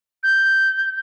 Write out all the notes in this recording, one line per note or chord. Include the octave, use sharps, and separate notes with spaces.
G6